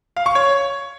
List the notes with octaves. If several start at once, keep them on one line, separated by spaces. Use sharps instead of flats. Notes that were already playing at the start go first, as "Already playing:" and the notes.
F5
C#6
C#5